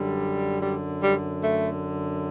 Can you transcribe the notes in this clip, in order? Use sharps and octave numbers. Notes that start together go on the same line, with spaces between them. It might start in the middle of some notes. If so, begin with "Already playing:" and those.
Already playing: F#2 D3 G3
G3
G3
A3